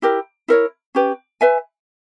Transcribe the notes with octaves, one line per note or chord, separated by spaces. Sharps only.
E4 G4 A#4
E4 A#4 C#5
C#4 G4 B4
B4 E5 G#5